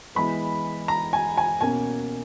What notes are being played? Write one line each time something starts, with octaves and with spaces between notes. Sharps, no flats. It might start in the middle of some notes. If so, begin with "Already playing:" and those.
E3 G#3 B3 B5
A#5
G#5
G#5
B2 A#3 C#4 G#5